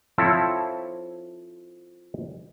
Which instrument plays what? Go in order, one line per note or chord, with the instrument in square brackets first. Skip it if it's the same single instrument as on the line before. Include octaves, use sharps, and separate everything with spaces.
[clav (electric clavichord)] F3 C4 E4 A4 C#5